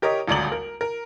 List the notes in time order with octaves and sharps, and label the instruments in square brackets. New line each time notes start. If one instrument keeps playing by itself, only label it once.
[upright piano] G4 A#4 C#5 D#5
D#1 G#1 D2 D5 A#5 F#7
A#4
A#4